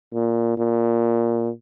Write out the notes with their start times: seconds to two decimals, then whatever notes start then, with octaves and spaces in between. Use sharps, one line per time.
0.14 A#2
0.58 A#2